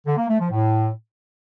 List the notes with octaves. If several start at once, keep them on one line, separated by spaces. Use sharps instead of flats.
D3
A#3
A3
F3
A2